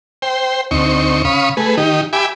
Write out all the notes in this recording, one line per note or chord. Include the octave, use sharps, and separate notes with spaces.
C5 G5
D2 C4 D#4 C#6
C#3 F5 B5 C#6 D#6
A3 G#4 B4
D#3 D#4 G4
G4 E5 G#5 B5 D6